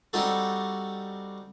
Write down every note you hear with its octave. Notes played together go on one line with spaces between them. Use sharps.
G3 C4 D#4 F#4 A4